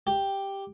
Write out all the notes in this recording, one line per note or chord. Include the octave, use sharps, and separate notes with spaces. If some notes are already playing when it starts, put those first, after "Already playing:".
G4